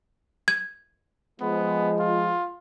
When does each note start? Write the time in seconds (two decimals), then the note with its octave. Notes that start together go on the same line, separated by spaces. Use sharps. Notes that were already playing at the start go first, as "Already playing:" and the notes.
0.48 G#6
1.40 F3 G#3 B3
1.99 F4